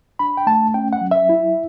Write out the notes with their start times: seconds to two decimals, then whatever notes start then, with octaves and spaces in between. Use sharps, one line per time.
0.19 D4 B5
0.37 G5
0.47 A3 A5
0.74 C#4 G5
0.93 F#5
1.01 F#3
1.11 E5
1.29 E4